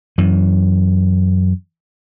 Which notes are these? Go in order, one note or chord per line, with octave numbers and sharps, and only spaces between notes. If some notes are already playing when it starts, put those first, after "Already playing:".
F#2 E3